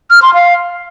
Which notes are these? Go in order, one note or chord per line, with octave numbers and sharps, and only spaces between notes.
F6
C6
F5